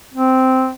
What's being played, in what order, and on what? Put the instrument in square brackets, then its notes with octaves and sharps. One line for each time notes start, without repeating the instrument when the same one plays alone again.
[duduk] C4